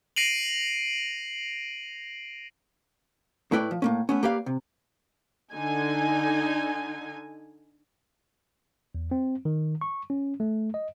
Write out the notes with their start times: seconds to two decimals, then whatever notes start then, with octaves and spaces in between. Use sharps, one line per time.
0.16 A#6 C7 D7 D#7 F7 F#7
3.51 A2 A3 E4 B4 D5 G5
3.71 F3
3.82 A2 A#3 C#4
4.09 A3 B3 C#4
4.23 A#3 G4 B4 D5 F5
4.46 C3
5.51 D3 D#4 G#5
8.95 E2
9.11 C4
9.45 D#3
9.81 C#6
10.10 C#4
10.40 A3
10.74 D#5